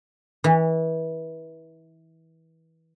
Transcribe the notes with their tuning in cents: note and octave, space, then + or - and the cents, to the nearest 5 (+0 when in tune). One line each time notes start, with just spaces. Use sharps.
E3 -25